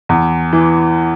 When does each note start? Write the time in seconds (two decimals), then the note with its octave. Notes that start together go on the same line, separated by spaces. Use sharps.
0.09 E2
0.53 E3